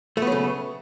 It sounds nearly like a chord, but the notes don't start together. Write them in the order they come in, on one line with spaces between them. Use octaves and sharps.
A3 B3 F#3 C#3